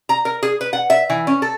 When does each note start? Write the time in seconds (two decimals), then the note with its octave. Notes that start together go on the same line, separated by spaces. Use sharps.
0.09 A#5
0.25 A#4
0.43 G#4
0.61 B4
0.73 F#5
0.90 E5
1.10 E3
1.27 C#4
1.42 A4